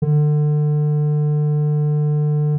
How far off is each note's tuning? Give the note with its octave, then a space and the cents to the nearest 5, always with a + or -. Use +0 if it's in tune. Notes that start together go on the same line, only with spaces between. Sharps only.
D3 +30